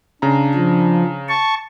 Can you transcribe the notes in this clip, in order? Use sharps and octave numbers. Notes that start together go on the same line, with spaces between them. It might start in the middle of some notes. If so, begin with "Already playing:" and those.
C#3 D4 A#5
F3
A5 C#6